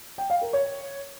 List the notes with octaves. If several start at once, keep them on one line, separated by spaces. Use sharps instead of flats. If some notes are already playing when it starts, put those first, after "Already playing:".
G5
F5
A#4
C#5